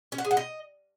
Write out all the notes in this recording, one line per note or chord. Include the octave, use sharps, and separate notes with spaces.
C#4
F#5
G#4
F#5
D#5